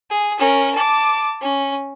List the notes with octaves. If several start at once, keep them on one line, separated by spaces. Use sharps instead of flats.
G#4
C#4 A#4
A5 D6
C#4